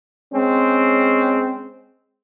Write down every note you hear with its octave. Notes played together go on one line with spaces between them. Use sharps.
G#3 C4 C#4